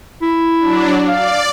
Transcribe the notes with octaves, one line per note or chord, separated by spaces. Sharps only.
E4
F#3 D4
D5 F5